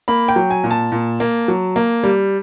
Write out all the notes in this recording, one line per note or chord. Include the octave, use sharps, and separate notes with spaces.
A#3 B5
G5
F#3
G#5
A#2
A5
A#2
A#3
F#3
A#3
G3